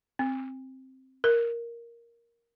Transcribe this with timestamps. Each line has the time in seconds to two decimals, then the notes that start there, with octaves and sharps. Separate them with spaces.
0.19 C4
1.24 A#4